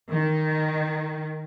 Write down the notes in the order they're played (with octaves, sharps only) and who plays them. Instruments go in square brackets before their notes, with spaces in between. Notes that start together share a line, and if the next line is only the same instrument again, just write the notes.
[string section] D#3